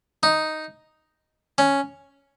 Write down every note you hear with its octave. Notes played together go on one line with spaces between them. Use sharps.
D#4
C#4